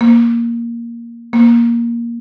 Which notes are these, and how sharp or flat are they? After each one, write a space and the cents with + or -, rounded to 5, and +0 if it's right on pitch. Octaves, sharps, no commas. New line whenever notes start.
A#3 +5
A#3 +10